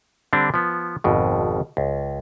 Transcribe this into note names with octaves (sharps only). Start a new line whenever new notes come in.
D3 G3 C4 D4
F3 B3
G#1 F2 B2
C#2